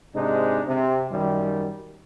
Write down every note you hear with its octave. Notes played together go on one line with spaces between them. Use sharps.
G#2 C3 G#3 D4 D#4
C3
F#2 D#3 G3